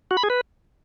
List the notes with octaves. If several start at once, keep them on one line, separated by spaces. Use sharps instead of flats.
F#4
B5
G#4
B4